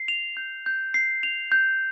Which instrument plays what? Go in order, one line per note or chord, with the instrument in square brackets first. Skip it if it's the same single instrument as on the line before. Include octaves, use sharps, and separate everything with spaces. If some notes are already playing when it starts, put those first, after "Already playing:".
Already playing: [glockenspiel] C7
F7
G6
G6
C7
F7
G6